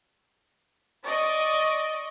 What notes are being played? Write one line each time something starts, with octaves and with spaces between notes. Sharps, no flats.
D5 D#5 C#6